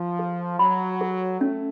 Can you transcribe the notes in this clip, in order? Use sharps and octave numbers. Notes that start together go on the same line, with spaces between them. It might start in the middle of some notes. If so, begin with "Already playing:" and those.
Already playing: F3
A4
F#3 B5
A4
A3 C#4